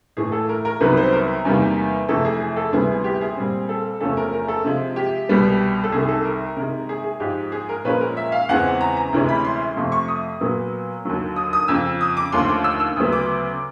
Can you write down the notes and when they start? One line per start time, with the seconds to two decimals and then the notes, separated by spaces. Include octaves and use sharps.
0.17 A2 E3 A3 G#4
0.32 A4
0.49 A#4
0.65 A#4
0.80 C2 C3 D#3 F#3 B3 B4
0.97 C5
1.13 A#4
1.45 E2 C3 D#3 G3 A#3
2.09 F2 C3 E3 A3 A4
2.25 G#4
2.40 G#4
2.57 A4
2.72 D2 C3 E3 G3 B3 G#4
3.04 G4
3.21 G#4
3.36 A#2 G3 C4
3.69 A4
4.01 E2 C3 F3 A3 C#4 A4
4.17 A#4
4.33 A#4
4.48 A4
4.65 C3 F3 G#3
4.96 G4
5.29 C2 B2 G3 B3
5.84 A4
5.92 C2 C3 D#3 G#4
6.08 A4
6.25 A#4
6.56 C3 D#3 G#3 A#4
6.89 G#4
7.04 G#4
7.20 G#2 F3 G#3 G4
7.52 G#4
7.69 A#4
7.85 A#2 F3 G#3 C#4 B4
8.01 A#4
8.17 E5
8.32 F5
8.49 E2 C#3 E3 G#3 C4 F#5
8.81 A#5
8.97 A#5
9.13 D2 C3 E3 G#3 C#4
9.28 B5
9.45 C6
9.76 F2 C3 F3 A3
9.92 C#6
10.08 D#6
10.41 A#2 F#3 B3
11.05 D#2 D3 F#3
11.36 D#6
11.53 D#6
11.68 F2 C#3 F3 E6
12.01 D#6
12.17 D6
12.32 D#2 D3 F3 A3 C#4 C6
12.48 D6
12.64 E6
12.80 E6
12.96 D2 C#3 F#3 B3 D#6
13.12 D6